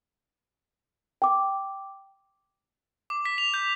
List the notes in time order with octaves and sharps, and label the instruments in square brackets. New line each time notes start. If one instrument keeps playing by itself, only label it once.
[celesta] G5 D6
[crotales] D6
B6
F7
G6